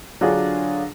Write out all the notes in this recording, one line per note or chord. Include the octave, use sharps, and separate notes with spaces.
D3 F#3 D4 F4 G#4